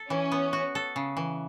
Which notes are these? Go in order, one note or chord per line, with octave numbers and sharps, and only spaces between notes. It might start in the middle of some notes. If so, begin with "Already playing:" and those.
Already playing: A4
E3 C#4
B3
F#4
A4
C#3
E3